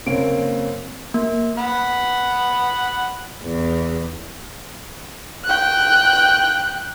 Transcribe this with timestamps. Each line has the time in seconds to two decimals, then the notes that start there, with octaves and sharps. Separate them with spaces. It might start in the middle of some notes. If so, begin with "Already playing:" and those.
0.06 F#1 A#3 C4 C#4 D7
1.14 A#3
1.58 F#5 B5
3.42 E2
5.45 G5 F#6